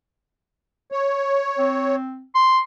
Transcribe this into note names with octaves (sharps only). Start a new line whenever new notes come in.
C#5
C4
C6